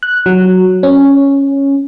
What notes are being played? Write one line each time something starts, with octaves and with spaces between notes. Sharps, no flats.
F#6
F#3
C#4